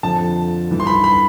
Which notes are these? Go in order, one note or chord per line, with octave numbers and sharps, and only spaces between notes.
F2 D3 F3 A5
G2 E3
C6
B5
B5